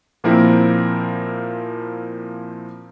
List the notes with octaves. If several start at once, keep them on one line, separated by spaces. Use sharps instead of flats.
A#2 F3 A#3 C4 E4 A#4